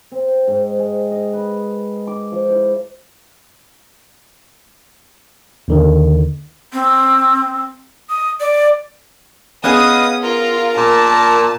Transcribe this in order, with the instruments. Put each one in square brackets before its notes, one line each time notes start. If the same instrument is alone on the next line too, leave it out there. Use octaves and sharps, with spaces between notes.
[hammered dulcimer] C4
G#2
G#3
D#5
B4
D6
F3
E4
[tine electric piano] D#2 D3 D#3
[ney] C4
[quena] D#6
D5
[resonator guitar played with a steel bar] B3 C#4 G#4 [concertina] B4 D#5 F5 [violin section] D#6
[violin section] F4 [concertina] A#4 A#5
[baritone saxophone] A#2 [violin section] A5